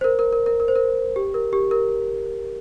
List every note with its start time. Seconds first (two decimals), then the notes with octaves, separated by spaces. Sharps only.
0.01 C5
0.04 A#4
0.19 A#4
0.33 A#4
0.46 A#4
0.60 A#4
0.68 C5
0.76 A#4
1.16 G4
1.34 A#4
1.53 G4
1.71 A#4